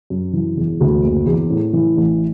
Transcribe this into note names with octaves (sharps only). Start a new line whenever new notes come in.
F#2
E3
E1
D2
F#1
E2
A2
E3
A1